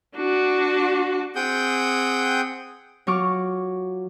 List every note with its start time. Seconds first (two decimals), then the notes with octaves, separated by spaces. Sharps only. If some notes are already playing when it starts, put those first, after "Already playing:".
0.16 D4 F#4
1.35 C4 G#4 F#5 G5 D#6 G6
3.07 F#3 F4 C#6 D6 F6